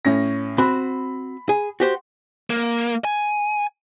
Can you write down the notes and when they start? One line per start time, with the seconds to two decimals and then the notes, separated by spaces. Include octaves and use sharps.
0.05 A2 C#4 A#6
0.58 C4 F#4 B5
1.49 G#4
1.80 F#4 G4 C5
2.50 A#3
3.05 G#5